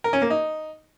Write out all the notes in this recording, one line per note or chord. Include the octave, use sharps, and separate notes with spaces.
A#4
C#4
A#3
D#4